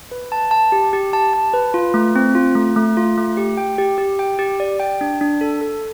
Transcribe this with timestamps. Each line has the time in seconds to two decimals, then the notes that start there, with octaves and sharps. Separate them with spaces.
0.11 B4
0.32 A5
0.51 A5
0.72 G4
0.93 G4
1.13 A5
1.33 A5
1.54 B4
1.74 F4
1.94 A3
2.16 C4
2.35 F4
2.55 A3
2.76 A3
2.97 F4
3.18 A3
3.37 G4
3.57 G5
3.78 G4
3.98 G4
4.19 G5
4.39 G4
4.60 D5
4.80 G5
5.01 D4
5.21 D4
5.41 A4
5.61 A4